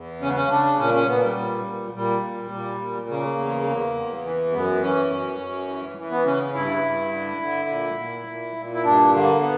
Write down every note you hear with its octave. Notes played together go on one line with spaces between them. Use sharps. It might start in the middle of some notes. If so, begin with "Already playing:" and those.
Already playing: E2
C#3 C#4
B3
C#4
C#3 D4
A#2 C#4
C#4
A#2 B3
G3
A#2
A#2
A#2 G3
A#2
A#2
A#2
C#3 A#3
E2
E2
E2
E3
F#2 B3
E3 C#4
F#2
F#2
E3
E3
B3
C#3 C#4
G2 E4
G2
D3
D3
A#2
A#2
A#2
A#2
E4
G2 D4
D3 A#3
B3